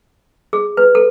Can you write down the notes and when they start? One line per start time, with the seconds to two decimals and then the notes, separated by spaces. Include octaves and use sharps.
0.53 G#4
0.77 B4
0.95 A4